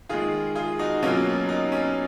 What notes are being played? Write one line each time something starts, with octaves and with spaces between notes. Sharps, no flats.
D#3 G#3 F4 G#4
F4 G#4
D#4 F#4
B2 F#3 A#3 C#4 F4
D#4
C#4